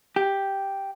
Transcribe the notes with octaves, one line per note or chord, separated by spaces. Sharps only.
G4